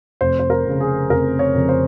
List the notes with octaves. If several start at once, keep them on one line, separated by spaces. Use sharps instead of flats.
F1 C5
C5
A#4
F2 C#3
G#4
F1 A#4
C#5
F2 C#3
C5